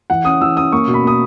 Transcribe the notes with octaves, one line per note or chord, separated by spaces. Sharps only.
E3 F#5
C#4 D#6
E3 E6
C#4 D#6
A#3 C#6
B2
B5
A#3 D#6